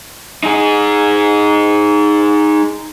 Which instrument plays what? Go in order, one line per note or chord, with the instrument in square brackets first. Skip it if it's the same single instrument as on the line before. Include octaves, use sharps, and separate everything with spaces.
[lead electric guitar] D#4 G#4